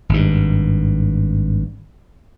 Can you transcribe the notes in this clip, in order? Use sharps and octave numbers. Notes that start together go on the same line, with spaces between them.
G#1 G2